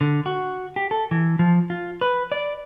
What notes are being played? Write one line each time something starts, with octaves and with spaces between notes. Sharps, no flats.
D3
F#4
G4
A4
E3
F3
F4
B4
D5